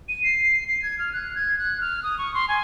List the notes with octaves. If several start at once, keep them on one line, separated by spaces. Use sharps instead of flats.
D#7
C7
C7
G#6
F6
F#6
G#6
F#6
F6
D#6
C#6
C6
G#5